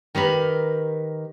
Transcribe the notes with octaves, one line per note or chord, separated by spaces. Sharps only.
D#3 G4 A#4 B4